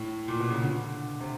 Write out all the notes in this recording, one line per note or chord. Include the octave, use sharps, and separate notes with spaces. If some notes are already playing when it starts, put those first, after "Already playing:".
Already playing: A2
A#2
B2
C#3
D3
C3